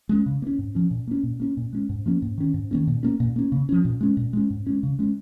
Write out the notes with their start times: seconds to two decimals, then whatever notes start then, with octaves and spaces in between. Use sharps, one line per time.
0.09 G#3 C#4
0.26 C#3
0.42 A#3
0.47 C#4
0.59 G#2
0.75 F3 C#4
0.91 A#2
1.08 A#3 C#4
1.23 A#2
1.40 A#3 C#4
1.57 A#2
1.73 G#3 C#4
1.89 G#2
2.06 F3 A#3 C#4
2.22 G#2
2.38 D#3 C#4
2.54 G#2
2.71 D#3 A#3 C#4
2.87 A#2
3.03 A#3 C#4
3.20 A#2
3.36 A#3 C#4
3.52 C#3
3.69 F3 C#4
3.85 A#2
4.01 G#3 C#4
4.17 A#2
4.33 G#3 C#4
4.50 G#2
4.67 G#3 C#4
4.83 C#3
4.99 G#3 C#4